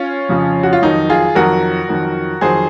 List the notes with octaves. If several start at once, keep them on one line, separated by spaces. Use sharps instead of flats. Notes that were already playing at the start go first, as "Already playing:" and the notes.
Already playing: C#4 F4
F2 C#3 F3
F#4
F4
F2 D#3 F#3 D#4
F4 G#4
F2 D#3 F#3 F#4 A#4
F2 D#3 F#3
F2 D#3 F#3 G#4 C5